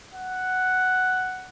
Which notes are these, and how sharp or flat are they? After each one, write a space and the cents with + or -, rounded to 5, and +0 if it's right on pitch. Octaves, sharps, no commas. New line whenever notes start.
F#5 +5